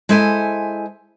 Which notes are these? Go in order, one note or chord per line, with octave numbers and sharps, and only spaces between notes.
G#3 E4 A4 C5 E5 G#5